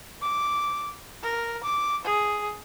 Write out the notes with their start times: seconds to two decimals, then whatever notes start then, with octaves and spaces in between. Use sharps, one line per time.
0.22 D6
1.23 A#4
1.64 D6
2.05 G#4